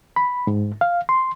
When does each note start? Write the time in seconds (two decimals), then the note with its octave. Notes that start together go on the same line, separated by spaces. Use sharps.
0.16 B5
0.47 G#2
0.81 F5
1.09 C6